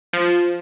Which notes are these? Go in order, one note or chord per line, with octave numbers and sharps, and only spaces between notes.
F3